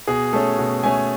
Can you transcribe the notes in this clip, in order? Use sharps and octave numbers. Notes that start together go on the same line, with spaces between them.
B2 G#4
A3 C#4 A4
B2
A3 C#4 G#5